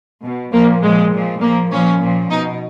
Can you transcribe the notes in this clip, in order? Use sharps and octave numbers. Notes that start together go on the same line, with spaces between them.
B2
A#2 F3 A#3
A#2 F3 G#3
A#2 F3
A#2 F3 A#3
A#2 F3 C#4
A#2 F3
B2 D#4